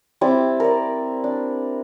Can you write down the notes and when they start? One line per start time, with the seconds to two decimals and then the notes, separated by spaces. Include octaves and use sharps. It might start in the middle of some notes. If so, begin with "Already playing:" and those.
0.21 G3 C4 E4 D6
0.60 A#4 D5
1.24 D4